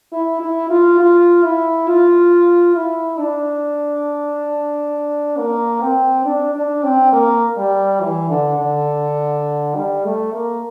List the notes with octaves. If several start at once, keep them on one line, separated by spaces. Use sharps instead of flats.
E4
E4
F4
F4
E4
F4
E4
D4
A#3
C4
D4
D4
C4
A#3
G3
E3
D3
D3
G3
A3
A#3